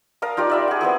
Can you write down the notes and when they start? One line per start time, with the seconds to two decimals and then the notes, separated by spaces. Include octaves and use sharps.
0.22 A#4 F5 A5 D#6
0.37 D#4 F4 G4 D5
0.50 D5 E5 B5
0.68 G#4 F#5
0.81 B3 C4 E4 G#4